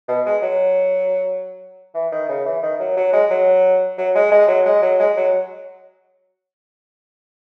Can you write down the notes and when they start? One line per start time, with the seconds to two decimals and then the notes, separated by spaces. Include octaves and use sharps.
0.08 B2
0.26 G#3
0.42 F#3
1.95 E3
2.12 D#3
2.29 C#3
2.45 E3
2.63 D#3
2.80 F#3
2.97 F#3
3.13 G#3
3.30 F#3
3.98 F#3
4.15 G#3
4.32 G#3
4.48 F#3
4.66 G#3
4.83 F#3
4.99 G#3
5.17 F#3